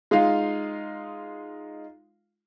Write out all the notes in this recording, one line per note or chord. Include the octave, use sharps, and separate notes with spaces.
G#3 D#4 F4 F5